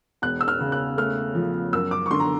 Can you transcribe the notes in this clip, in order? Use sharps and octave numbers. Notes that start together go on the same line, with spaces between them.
E1 F#6
E6
F6
C#3
F#6
A3 F6
F3
F#2 E6
D6
C#6
D3 C6
A#5